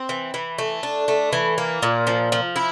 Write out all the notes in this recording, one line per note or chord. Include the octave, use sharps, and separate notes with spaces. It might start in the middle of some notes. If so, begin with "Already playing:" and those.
Already playing: C4
E3
E3
A3
D4
A3
E3
A#3
A#2
F3
F3
E4